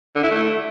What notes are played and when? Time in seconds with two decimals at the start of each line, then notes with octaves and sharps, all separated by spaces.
0.15 D3
0.23 E4
0.31 A3